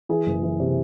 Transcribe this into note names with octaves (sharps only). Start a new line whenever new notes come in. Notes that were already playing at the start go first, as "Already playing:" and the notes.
E3 G#4
F#1
E3
C3